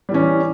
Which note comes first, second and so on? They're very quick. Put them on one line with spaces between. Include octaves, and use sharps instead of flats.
G3 E3 C#4